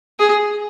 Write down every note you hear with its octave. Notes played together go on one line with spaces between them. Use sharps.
G#4